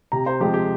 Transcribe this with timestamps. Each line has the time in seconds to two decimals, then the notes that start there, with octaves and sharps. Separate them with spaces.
0.12 C3 A#5
0.26 C5
0.40 F3 G#3 C4 G4
0.54 G4